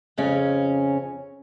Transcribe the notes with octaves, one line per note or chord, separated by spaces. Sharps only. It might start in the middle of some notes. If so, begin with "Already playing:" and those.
F2 C#3 C#4